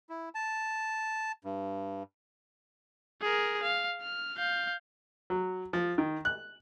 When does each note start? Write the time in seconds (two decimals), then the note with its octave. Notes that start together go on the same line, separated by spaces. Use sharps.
0.10 E4
0.35 A5
1.44 G2
3.22 G#4 A#4
3.62 F5
4.01 F6
4.37 F5 G6
5.30 F#3
5.73 F3
5.98 D#3
6.25 F#6